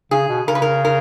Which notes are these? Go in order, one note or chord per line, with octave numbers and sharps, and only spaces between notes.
C#3 G#4
B2
C#3 A#4
B4
A#4
A#4